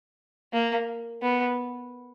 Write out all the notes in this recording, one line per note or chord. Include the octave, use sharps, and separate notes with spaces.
A#3
B3